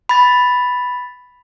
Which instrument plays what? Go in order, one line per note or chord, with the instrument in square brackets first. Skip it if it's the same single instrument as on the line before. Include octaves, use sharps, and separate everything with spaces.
[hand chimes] B5 A6